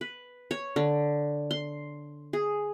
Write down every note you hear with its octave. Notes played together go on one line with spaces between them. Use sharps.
B4
C#5
D3
C6
G#4